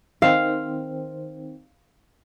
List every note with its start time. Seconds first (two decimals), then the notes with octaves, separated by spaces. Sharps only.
0.22 D#3 C4 F5